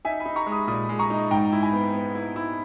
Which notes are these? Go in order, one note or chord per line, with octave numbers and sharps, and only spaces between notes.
D#4 E5 G#5
G#5 B5
D#4
A#5 C#6
G#3
B5 D#6
A#2 B5 D#6
G#3
A#5 C#6
D#4
G#2 G5 A#5
E4
G#5 B5
B3
B3
E4
E4